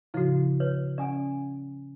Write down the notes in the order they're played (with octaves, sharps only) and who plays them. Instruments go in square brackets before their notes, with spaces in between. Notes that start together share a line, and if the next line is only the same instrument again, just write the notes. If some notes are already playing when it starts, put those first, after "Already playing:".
[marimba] A2 C#3 F3 [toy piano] E4 F#4
[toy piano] B4 C#5
[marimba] C#4 F#5 [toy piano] D5 G#5